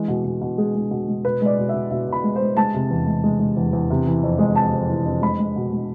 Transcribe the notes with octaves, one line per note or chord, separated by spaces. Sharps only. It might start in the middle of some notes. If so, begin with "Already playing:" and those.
Already playing: E3 G#3
B2
B2
B2
G#3 G#4
G#3
B2
G#3
B2 B4
G#3 D5
B2
B2 E5
B2 E5
B2 B5
G#3
C5
G#3
G#3 A5
C3
E2
G#3
G#3
G#3
E2
E2
C3
E3
F2
G#3
F2 A5
F2
E3
F2
G#3 B5
G#3
B2
G#3